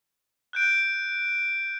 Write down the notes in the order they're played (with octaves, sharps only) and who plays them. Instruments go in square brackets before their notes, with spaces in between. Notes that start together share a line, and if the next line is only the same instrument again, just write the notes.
[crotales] F#6 G6 D7